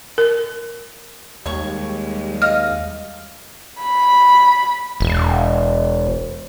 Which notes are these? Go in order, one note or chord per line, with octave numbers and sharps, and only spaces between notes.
A#4
D#2 G3 G#3 C#5 C#6
D#5 F5 F6
B5
E1